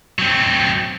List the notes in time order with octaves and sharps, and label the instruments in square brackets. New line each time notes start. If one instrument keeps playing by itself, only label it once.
[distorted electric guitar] F#3 C4